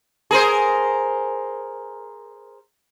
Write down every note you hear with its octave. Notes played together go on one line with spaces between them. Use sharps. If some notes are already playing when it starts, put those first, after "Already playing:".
G#4 A#4 C5